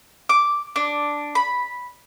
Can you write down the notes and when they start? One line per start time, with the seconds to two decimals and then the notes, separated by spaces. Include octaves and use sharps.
0.29 D6
0.76 D4
1.35 B5